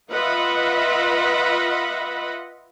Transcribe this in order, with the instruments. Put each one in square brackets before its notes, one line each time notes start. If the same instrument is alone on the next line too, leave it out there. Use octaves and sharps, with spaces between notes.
[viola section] F4 B4 D#5 E5 F#5 B5